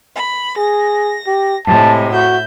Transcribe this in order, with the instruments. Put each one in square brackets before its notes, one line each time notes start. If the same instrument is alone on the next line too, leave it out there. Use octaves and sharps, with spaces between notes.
[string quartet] B5
[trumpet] G#4 [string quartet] A#6
[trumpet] G4
[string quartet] A2 C3 G#3 [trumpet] A5
[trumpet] F#4 [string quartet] E5 G6